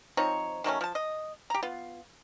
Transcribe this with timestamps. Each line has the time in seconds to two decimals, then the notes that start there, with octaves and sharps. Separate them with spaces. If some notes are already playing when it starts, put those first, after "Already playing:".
0.17 F3 C4 D#4 C#5
0.64 D#3 F#3 A3 C#4
0.81 F3 A5
0.95 D#5
1.50 G4 A#5
1.63 B3 F4